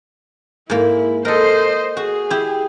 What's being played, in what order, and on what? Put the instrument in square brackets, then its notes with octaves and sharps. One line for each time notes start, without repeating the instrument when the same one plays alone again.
[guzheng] G#2 A#3 [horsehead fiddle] E4
[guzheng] A4 A#4 [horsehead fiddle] C5 D#5
[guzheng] F#4 [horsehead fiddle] G#4
[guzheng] E4 G4